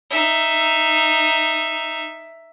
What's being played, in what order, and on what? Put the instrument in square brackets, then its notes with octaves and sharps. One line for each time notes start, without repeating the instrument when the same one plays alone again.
[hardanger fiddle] D#4 E5